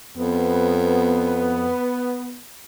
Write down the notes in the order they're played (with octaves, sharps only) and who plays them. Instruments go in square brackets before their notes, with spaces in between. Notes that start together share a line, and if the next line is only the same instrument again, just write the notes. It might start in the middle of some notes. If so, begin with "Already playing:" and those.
[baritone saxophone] F2 [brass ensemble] B3